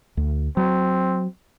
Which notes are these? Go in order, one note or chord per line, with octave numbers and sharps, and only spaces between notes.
D2
F#3 C4